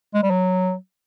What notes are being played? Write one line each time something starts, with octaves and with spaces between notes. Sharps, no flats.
G#3
G3
F#3